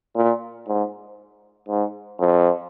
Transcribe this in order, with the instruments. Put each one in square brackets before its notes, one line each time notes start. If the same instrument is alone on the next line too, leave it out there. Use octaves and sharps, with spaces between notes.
[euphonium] A#2
G#2
G#2
F2